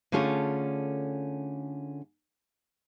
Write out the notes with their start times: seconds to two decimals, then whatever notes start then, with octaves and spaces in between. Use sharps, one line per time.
0.12 D3 A3 C#4 F4 G#4 C#5